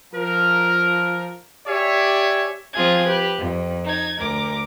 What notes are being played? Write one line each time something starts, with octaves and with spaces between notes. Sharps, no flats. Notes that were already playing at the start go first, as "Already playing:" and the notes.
F3 A#4
G4 C#5 D5 E5 G#5
F3 C4 F4 G#4 G#6
G4 B4
F2
D#4 G#6
D2 A#4 D6